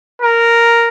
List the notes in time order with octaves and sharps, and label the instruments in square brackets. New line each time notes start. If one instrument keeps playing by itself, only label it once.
[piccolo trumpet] A#4